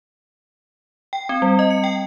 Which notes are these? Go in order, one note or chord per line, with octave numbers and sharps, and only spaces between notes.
G5
C4
G3
D#5
C#7
G5